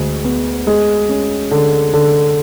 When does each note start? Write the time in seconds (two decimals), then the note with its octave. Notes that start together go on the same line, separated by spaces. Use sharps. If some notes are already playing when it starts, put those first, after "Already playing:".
Already playing: D2 G#3
0.24 B3
0.67 G#3
1.09 C#4
1.51 D3
1.93 D3